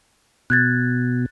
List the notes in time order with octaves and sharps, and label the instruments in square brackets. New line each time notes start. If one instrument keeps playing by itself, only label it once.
[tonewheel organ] B2 [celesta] F#6 G#6 A6